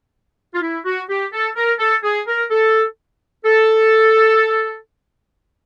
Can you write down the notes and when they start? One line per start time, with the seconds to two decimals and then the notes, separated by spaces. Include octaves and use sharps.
0.54 F4
0.62 E4
0.85 F#4
1.09 G4
1.32 A4
1.56 A#4
1.79 A4
2.03 G#4
2.27 A#4
2.50 A4
3.45 A4